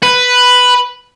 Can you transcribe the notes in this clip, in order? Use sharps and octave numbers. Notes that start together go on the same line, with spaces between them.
B4